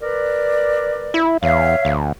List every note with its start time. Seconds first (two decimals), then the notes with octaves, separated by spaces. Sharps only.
0.01 A#4 B4 D5
1.14 E4
1.43 E2 C#5 E5 F5
1.85 D2